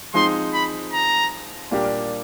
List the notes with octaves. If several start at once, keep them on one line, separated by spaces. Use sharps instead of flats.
F3 G#3 C4 D#4 C6
B5
A#5
A#2 G3 A#3 D4 G4